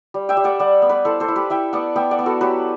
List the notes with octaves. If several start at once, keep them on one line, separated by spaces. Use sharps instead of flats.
G3
E5 G5
G3
D5 F#5
G3 D5 F#5
B3
B4 D5
E4 A4 C5
A4 C5
E4
G4 B4
E4 E5 G5
B3 D5 F#5
B3 E5 G5
D5 F#5
B3
F#4 A4
F#3 G4 B4